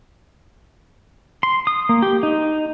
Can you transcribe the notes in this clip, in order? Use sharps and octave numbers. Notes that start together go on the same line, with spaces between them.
C6
D#6
A#3
G4
D#4